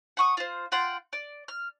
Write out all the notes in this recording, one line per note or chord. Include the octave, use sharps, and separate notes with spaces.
F#5 C#6 D#6
F4 C5
F4 F#5 G5 C6
D5
F6